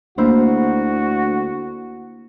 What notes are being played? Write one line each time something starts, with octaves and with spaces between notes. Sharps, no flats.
D2 A#3 E4 F#4 C5